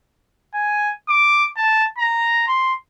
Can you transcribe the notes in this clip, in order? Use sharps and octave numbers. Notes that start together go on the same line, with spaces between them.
G#5
D6
A5
A#5
C6